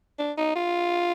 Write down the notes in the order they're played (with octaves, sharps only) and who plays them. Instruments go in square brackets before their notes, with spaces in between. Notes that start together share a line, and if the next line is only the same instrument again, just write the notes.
[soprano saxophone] D4
D#4
F4